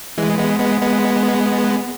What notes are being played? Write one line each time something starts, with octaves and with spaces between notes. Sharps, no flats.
E3 G#3
G#3 B3
G#3 B3
G#3 B3